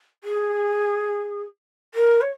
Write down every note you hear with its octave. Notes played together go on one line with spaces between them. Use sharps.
G#4
A#4
C#5